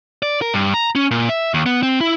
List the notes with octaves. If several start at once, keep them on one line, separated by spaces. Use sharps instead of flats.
D5
A#4
G2
A#5
C#4
A#2
E5
D#2
B3
C4
E4